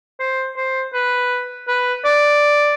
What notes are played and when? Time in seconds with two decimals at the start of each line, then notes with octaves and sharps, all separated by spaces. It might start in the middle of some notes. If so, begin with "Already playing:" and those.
0.20 C5
0.57 C5
0.94 B4
1.68 B4
2.05 D5